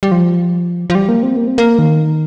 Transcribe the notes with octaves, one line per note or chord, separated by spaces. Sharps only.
G3
F3
F3
G3
A#3
C4
A#3
C4
A#3
D#3